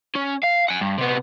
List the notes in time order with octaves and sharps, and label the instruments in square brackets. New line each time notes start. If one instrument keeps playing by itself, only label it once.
[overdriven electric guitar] C#4
F5
F#5 G#5
G2
C3 B3